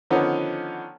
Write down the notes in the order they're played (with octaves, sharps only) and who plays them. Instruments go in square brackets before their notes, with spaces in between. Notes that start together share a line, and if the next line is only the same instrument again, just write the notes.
[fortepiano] D3 D#3 F3 B3 C#4 D#4